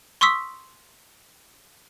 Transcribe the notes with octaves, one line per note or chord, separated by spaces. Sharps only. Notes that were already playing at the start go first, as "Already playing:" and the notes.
C6 C#6 D#6 E6 B6